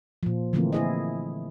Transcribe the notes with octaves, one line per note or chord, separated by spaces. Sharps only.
A#2 F3
D3 E3 F3 A3 A#3 C4
E4 G#4 D#5